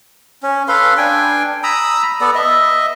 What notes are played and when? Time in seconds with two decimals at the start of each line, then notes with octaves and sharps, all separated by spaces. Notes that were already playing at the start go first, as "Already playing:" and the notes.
0.43 C#4
0.68 A4 B4 F5 C6
0.97 D4 G5 G#5
1.63 A#5 B5 D#6 E6
2.21 B3 A4 D5
2.35 D#5 E5